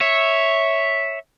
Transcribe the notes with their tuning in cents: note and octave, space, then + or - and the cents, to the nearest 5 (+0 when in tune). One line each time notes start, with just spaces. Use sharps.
C#5 +0 E5 -5